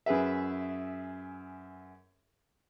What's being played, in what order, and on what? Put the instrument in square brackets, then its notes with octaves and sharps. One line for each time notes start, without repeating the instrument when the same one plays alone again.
[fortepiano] F#2 G#4 B4 E5